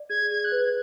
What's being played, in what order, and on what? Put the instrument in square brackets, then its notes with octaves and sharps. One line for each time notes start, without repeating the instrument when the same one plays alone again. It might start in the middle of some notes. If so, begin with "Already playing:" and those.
Already playing: [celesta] D5
[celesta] G#4 [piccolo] G#6
[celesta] G#4 [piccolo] G#6
[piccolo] F#6
[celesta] B4